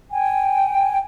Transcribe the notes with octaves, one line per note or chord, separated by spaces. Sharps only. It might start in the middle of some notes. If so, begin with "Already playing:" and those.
G5 G#5